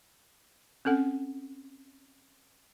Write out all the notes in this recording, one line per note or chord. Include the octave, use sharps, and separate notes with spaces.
C4 C#4 A4 F#5